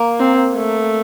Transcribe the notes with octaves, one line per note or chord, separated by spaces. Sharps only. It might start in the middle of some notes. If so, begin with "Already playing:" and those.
Already playing: A#3
C4
A3